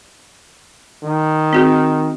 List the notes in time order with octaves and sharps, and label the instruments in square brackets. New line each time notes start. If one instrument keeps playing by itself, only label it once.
[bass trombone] D#3
[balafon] C4 F#4 G#4